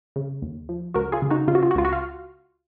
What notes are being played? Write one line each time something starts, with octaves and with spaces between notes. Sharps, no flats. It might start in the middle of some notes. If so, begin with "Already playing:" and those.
C#3
D#2
F3
C#2 F#4 A#4
F4 G#4
C#3
D#4 F#4
C#3 F4
F#4
F4
F#4
C#2 F4
F#4
F4